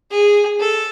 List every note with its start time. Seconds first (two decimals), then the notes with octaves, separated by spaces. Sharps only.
0.11 G#4
0.60 A4